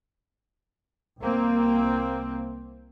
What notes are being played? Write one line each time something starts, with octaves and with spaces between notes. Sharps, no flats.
C2 A#3 C4